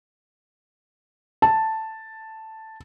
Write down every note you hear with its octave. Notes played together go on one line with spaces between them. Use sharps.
A5